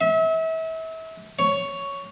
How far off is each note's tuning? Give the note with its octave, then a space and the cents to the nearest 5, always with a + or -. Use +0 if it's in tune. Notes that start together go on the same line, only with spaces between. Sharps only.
E5 -35
C#5 +10